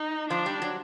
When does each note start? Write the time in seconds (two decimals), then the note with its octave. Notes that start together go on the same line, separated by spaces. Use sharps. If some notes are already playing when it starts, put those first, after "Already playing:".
Already playing: D#4
0.30 F3 D4
0.46 G3
0.62 F#3